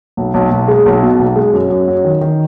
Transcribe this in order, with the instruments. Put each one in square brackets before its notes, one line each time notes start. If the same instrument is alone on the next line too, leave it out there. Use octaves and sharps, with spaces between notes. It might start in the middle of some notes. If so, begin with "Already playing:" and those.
[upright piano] B1
B1
B1
G#3
B1
B2
B1
G#3
F#2
F#2
F#3
D#3
D#3